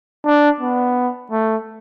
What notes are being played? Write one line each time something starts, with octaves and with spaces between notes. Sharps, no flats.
D4
B3
A3